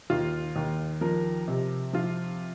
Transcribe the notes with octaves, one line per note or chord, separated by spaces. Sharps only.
D#2 F4
D#2
F3 A#4
C3
F3 F4